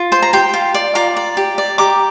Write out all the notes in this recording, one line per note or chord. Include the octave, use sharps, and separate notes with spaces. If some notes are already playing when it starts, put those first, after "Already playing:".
Already playing: F4
C5 C6
A#5
G4 G5 C6
F4
D5
F4 A#5 D6
D5
G4
D5
G4 A#5 D6